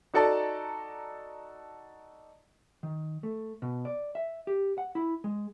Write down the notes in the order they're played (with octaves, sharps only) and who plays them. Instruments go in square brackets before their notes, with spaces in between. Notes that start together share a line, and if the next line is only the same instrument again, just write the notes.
[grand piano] D#4 F#4 A4 D5 A5 A#5
[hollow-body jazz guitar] D#3
A3
B2
D5
E5
G4
F#5
E4
G#3